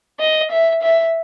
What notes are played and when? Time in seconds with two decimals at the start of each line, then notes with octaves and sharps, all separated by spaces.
0.20 D#5
0.51 E5
0.82 E5